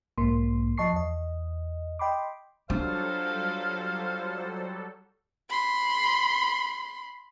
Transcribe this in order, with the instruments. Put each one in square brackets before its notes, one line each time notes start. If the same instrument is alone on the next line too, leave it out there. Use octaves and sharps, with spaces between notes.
[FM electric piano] B1 G#2 A#3 C6
F3 D#5 A5 C#6 C7
E2 D#5
D#5 G5 B5 C6 D6
[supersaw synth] F#3 G3 A4 [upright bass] D4 [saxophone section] F4 C5 [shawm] F5
[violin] B5 C6